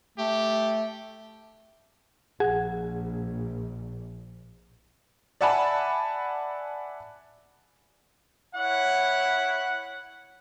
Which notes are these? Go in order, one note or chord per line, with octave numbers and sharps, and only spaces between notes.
A3 G4
A#1 G#4 F#5 G#6
D5 E5 F#5 G#5 A5 B5
E4 C#5 F#5